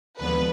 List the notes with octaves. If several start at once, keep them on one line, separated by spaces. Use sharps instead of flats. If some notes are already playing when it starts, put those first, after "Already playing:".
D#2 D3 F3 G#3 B3 B4